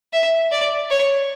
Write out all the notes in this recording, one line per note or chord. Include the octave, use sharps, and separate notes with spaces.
E5
D5
C#5